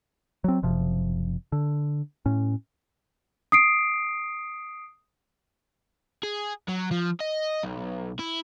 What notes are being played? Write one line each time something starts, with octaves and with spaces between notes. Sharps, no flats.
F#3 C4
F#1 C3 F3
D3
A2 C#4
D#6 C7 D7
G#4
F#3
F3
D#5
B1
E4